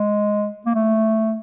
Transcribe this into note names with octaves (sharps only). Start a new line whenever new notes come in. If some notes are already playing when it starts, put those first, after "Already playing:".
Already playing: G#3
A#3
A3